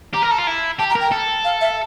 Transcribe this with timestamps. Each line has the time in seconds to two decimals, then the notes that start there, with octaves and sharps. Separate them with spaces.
0.14 G4 A#5
0.22 A#4
0.31 A4
0.38 F4
0.47 E4
0.79 G4 A5
0.90 A#5
0.95 A#4
1.01 G5
1.12 A4
1.45 F5
1.61 E5